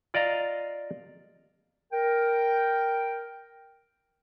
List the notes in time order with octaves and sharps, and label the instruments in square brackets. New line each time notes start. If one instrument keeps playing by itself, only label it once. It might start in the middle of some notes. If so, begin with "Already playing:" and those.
[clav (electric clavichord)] F4 D5 D#5 F5 A#5
[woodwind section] A#4 G5